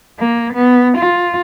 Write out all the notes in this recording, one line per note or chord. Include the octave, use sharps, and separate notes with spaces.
A#3
B3
F4